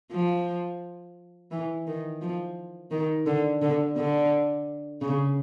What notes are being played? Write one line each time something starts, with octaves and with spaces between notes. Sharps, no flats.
F3
E3
D#3
F3
D#3
D3
D3
D3
C#3